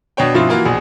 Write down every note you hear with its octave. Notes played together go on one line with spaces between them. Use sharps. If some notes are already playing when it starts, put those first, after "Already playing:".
B2 D4 C#5 G5
G2 B2 F3 C4 E4 F4
E3 A#3 F4 F#4
A#1 B2 G#4